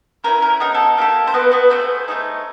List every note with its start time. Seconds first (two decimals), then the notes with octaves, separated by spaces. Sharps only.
0.24 A3 C#4 E4 A#4
0.42 A#4
0.60 B3 D#4 G#4 A#4
0.75 A4
0.97 A#3 D#4 G4 A4
1.27 C5
1.34 A#3 B3 F#4 B4
1.52 B3 B4
1.70 A3 C4 G#4 C5
2.08 A3 C4 D#4 G#4